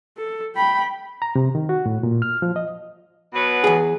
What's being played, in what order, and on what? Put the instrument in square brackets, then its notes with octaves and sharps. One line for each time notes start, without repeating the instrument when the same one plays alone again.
[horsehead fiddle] A4
G5 B5
[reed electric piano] A#5
C3
D#3
F#4
A2
A#2
F6
F3
D#5
[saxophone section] B2 F#3 B4
[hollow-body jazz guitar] E2 G#4